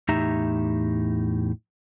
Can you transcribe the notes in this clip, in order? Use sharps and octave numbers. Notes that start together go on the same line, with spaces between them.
E2 A2 D#4 G4 E5 A#5